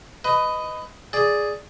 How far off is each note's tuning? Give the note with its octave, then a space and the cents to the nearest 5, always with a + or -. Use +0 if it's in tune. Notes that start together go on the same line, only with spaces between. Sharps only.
B4 +20 D#5 +0
G#4 +0 D5 +0